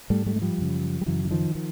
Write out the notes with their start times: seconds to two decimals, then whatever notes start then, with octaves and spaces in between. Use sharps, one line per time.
0.10 G#2 G3 A3
0.26 G3 A3
0.36 G#3
0.42 F3 G3
0.58 F#2 C#3
1.01 G3
1.06 F#2 C#3 E3 F#3
1.25 E3
1.31 D#3 F3
1.55 D#3 F3